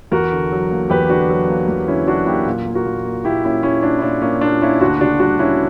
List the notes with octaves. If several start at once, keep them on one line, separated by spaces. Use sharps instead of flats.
E2 F#4 A#4
D3
F#3
A#3
E2 G4 B4
D3 D4 F#4
F#3
A#3
E2
D3 C#4 E4
F#3 D4 F#4
A#3 E4 G4
A#2
A#3
F#4 A#4
A#2
A#3
A#2 E4 G4
A#3 C#4 E4
A#2 C#4 E4
A#3 D4
E4
A#2 D4
A#3 C#4
A#2 D4
A#3 C#4 E4
D2 D4 F#4
C#3 D4 F#4
G3 D4 F#4
A#3 C#4 E4